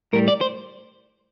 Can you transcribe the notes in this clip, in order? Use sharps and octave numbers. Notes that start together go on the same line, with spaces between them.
A2 G3 A#4
D5
C5